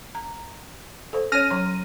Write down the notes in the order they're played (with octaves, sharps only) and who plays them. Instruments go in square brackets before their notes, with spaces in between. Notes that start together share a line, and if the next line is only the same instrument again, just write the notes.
[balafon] A#5
A4 C5
[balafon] C#4 C#5 [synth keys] F6 A#6 D#7
[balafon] F#3 A#5 C6